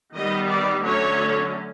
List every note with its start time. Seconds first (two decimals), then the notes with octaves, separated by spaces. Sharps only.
0.14 D#3 G3 B3 D#5
0.48 D5
0.83 D3 F#3 A3 C#4 C#5